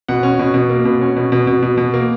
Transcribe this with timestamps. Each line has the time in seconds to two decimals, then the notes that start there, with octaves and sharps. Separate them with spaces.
0.08 B2 F#5
0.23 C#4
0.39 B2
0.54 B2
0.70 A#3
0.85 B2
1.01 C#4
1.16 B2
1.32 B2
1.47 B2
1.62 B2
1.77 B2
1.94 A#3